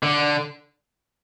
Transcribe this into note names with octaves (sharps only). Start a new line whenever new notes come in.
D3